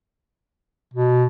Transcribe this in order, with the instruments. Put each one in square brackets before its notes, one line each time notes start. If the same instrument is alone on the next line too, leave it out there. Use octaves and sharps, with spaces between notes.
[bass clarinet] B2